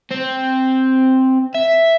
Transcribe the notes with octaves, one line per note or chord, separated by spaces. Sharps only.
C4
E5